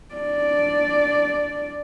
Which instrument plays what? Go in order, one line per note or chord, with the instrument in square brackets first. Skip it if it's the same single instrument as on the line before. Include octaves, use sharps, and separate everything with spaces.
[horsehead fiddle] D4 D5